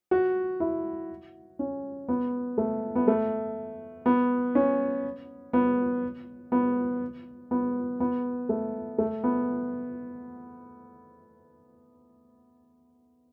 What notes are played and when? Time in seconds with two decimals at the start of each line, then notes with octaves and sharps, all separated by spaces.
0.11 F#4
0.60 E4
1.59 C#4
2.08 B3
2.58 A3
2.95 B3
3.08 A3
4.06 B3
4.55 C#4
5.53 B3
6.52 B3
7.51 B3
8.00 B3
8.49 A3
8.98 A3
9.24 B3